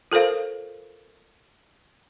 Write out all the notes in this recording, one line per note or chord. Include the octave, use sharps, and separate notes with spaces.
F4 A4 A#4 C5 F5